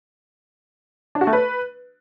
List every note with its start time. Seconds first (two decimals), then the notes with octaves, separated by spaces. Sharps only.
1.15 D4
1.21 F#4
1.27 A3
1.33 B4